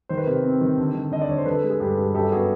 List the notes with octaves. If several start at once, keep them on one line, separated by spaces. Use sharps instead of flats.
D#3 C5
B4
C3 A#4 C5
C4
D#3
D3
D3
D3 D#5
D5
D3 C#5
C5
D3 A4 B4
G#3
G#4
G2 G4 A4
G2
F#2 G4 A4
B3 F#4 G#4